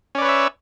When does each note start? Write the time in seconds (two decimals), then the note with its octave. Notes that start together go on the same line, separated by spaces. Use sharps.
0.15 C#4
0.18 D5
0.22 B4
0.25 C#5
0.28 E5